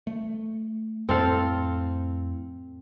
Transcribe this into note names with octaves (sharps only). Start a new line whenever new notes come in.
A3
F2 A2 C4 A4 F5